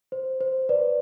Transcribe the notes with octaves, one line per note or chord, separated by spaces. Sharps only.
C5
C5
B4 D5